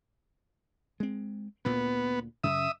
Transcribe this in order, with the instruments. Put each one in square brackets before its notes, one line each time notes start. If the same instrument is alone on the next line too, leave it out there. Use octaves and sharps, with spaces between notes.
[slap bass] G#3 C4
[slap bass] D2 A#2 A#3 [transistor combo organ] B3
[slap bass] F#2 C#3 [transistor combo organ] E5 D#6